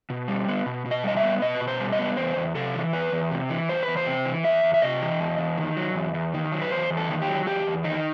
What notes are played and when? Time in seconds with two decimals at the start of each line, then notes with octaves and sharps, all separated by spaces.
0.10 B2
0.28 G3
0.48 B3
0.66 B2
0.85 B2
0.91 D#5
1.04 G3 D#5
1.17 E5
1.23 B3
1.42 B2 D#5
1.55 B4
1.61 B2
1.68 C5
1.80 G3
1.92 D#5
1.99 B3
2.17 E2 C5
2.36 E2
2.55 C3 A4
2.75 E3
2.93 E2 B4
3.12 E2
3.31 C3
3.50 E3
3.69 E2 C5
3.83 B4
3.88 E2
3.97 C5
4.07 C3
4.26 E3
4.44 E2 E5
4.63 E2
4.74 E5
4.82 C3 D#5
5.01 E3
5.20 E2
5.39 E2
5.58 D#3
5.77 F#3
5.95 E2
6.14 E2
6.34 D#3
6.52 F#3
6.62 B4
6.71 E2 C5
6.90 E2
6.97 A4
7.09 D#3
7.22 G4
7.28 F#3
7.47 E2 G4
7.67 E2
7.85 D#3 D#4